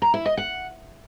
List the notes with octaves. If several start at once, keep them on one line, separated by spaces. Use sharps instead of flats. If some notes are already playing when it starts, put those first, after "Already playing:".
A#5
E4
D#5
F#5